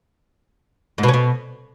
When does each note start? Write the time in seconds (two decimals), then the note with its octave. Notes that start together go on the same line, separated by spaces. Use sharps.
0.98 G#2
1.03 B2
1.08 C#4
1.14 B2